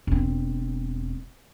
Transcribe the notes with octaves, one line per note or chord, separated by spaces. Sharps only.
E1 C4